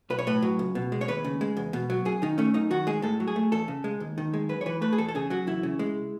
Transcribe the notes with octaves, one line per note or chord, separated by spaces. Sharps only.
B1 B4
C#5
A2 B4
F#3
C#2
B2
G#3
C#5
D#2 B4
C#3
G#3
E2
B2
F#3
F#2 G#4
D#3 D#4
A3 C#4
F#2 D#4
D#3 F#4
G#3 G#4
A2 A4
F#3
G#4
A3
E2 A4
C#3
G#3
D#2
D#3
G#3
F#2 B4
C#5
E3 B4
A3 B4
G#4
E2 A4
A4
C#3 G#4
F#3 F#4
E2 E4
C#3
G#3